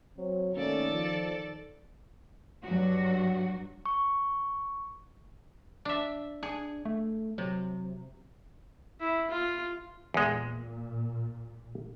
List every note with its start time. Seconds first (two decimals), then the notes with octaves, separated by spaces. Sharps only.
0.17 F#3 C4
0.54 D#3 A3 A#3 C#4 A4 D5
0.92 F3
2.62 G2 F#3 F#4
3.86 C#6
5.85 D4 E5
6.43 D4 G#4
6.85 A3
7.38 C3 F#3
9.00 E4
9.30 F4
10.14 E2 A#2 G#3